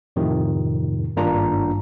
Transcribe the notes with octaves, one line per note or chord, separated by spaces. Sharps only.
F2 A2 C3 D#3 F3
G#1 G2 A#3 D4 F4 A#5